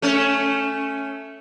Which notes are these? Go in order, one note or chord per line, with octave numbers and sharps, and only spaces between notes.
A3 C#4